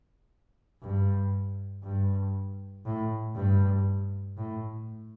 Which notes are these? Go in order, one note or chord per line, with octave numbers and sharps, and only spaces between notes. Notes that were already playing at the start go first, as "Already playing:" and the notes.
G2
G2
A2
G2
A2